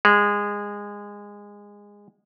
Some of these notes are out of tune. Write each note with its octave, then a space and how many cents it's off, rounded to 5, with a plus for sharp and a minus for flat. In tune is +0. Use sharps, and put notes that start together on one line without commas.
G#3 -20